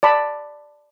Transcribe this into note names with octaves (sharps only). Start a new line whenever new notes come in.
D5 A5 B5